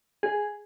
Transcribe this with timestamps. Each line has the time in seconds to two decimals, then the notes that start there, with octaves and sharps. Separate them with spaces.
0.23 G#4